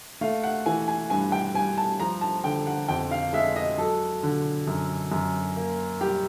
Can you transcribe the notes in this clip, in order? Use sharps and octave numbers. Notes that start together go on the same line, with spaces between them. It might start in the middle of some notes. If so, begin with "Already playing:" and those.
A3 F5
F#5
E3 G#5
G#5
G2 G#5
G5
G2 G#5
A5
F3 A#5
A5
D3 G5
F#5
F2 G5
F5
G#3 E5
D#5
F#3 A4
D3
F#2
F#2
A#3
G3 G4